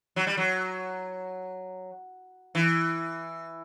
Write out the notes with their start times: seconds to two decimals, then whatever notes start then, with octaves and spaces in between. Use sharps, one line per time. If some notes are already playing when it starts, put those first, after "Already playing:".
0.16 F#3
0.27 G3
0.37 F#3
2.55 E3